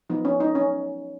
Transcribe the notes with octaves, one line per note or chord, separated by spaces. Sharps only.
F3 B3 D#4
C#4
D#4
C#4